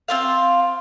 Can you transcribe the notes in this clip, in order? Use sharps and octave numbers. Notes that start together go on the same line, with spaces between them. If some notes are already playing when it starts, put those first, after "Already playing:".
C4 F4 F5